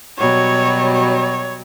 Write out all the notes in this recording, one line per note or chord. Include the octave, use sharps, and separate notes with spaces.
B2 F#3 G3 C#5
C#5